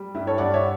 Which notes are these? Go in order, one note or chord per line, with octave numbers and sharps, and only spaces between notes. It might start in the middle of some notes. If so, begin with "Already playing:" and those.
Already playing: G3
G2 E4
A4 C#5
G2 D5 F#5
C#5 E5